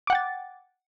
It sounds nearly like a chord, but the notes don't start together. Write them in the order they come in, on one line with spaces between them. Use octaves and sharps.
D6 F#5 G5 A6